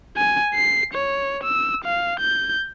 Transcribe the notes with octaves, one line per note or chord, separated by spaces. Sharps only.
G#5
C7
C#5
E6
F5
G6